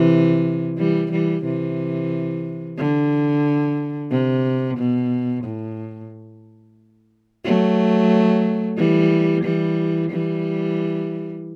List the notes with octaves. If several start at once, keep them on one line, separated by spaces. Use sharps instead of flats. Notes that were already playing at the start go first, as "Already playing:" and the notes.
Already playing: C3 E3
E3 G3
E3 G3
C3 E3
D3
C3
B2
A2
F#3 A3
E3 G3
E3 G3
E3 G3